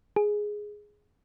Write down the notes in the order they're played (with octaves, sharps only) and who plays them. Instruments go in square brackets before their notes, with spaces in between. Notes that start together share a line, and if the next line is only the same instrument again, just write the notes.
[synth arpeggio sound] G#4